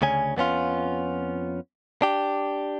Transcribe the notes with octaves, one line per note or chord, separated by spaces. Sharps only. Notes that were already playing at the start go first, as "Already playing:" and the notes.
D2 C#3 C#4 G#5
F2 B3 C#4 F4
D4 G4